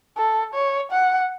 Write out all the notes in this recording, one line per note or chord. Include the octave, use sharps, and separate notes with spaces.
A4
C#5
F#5